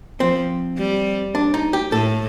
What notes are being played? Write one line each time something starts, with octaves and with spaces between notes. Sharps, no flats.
F3 C4
G3
D4
D#4
G4
A2 A4